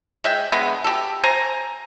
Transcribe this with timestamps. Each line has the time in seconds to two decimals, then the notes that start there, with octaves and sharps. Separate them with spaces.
0.24 G#3 E5 G5
0.52 D3 G#3 B3
0.84 G4 A4
1.23 C5 G#5 A#5